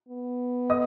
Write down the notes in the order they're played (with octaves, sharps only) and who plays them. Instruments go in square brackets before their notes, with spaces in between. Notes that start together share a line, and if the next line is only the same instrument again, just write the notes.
[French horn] B3
[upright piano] D#5 D#6